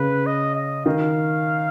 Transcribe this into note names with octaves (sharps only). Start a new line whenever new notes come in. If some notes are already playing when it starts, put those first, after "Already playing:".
Already playing: C#3 B4
D#5
D#5
D#3 F5